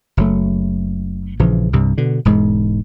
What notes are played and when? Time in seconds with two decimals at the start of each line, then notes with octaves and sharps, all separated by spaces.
0.17 F#1 F#3 A3
1.39 A#1 C#3 E3 F3
1.73 C2 G2 C3
1.98 B2 D3
2.25 E1 G#2 G#3